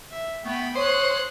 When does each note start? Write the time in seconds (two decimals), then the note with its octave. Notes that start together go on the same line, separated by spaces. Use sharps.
0.11 E5
0.45 A3 B3 G5 B5
0.75 C5 C#5 D#6 F#6